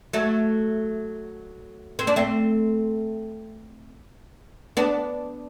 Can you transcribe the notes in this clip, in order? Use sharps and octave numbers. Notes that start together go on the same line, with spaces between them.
F#3 A3
C4
D4
A3 C4
B3 D4